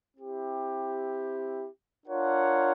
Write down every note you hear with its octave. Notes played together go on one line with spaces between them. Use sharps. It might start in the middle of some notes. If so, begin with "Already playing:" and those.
C4 E4 G4
D4 F4 A#4 C#5 F#5